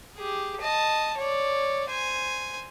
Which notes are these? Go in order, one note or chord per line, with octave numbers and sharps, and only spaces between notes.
G4 G#4
D#5 A5
C#5 D5
C5 G#5